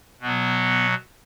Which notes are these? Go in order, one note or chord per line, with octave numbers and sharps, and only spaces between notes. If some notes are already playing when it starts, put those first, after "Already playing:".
B2 F#3 B3